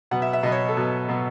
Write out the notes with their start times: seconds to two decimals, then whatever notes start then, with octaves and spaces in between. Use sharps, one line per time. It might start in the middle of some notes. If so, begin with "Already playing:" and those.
0.11 B2 F#3 B3 F#5
0.22 E5
0.33 E5
0.43 B2 F#3 B3 D#5
0.52 C#5
0.68 A4
0.77 B2 F#3 B3
1.09 B2 F#3 B3